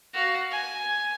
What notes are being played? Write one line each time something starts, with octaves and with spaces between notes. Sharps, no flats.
F#4 F5
G#5